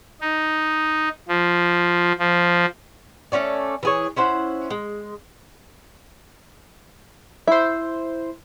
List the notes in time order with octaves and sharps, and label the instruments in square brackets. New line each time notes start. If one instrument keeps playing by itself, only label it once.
[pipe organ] D#4
F3
F3
[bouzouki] A3 C#4 F#4 D5
E3 G#4 C#5
C#4 E4 C5 F#5
G#3
[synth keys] E4 C5 [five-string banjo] E5